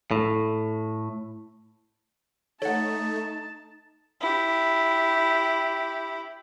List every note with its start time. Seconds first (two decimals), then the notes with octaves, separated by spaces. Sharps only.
0.11 A2
2.62 A3 D#4 C#5 F#5 A5
4.21 E4 G4